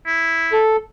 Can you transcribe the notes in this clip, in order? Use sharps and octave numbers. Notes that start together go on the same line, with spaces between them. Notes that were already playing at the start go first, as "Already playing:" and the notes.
E4
A4